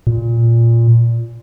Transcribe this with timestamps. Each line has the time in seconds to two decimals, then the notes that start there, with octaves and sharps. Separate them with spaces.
0.07 A#2